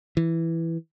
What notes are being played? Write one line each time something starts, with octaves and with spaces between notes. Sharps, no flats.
E3